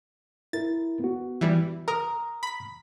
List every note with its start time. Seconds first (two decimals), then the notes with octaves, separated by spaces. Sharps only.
0.53 E4 A#4 A6
1.00 B3 F#4
1.41 E3 G3
1.88 A#4 A#5 D#6 F6
2.43 B5 B6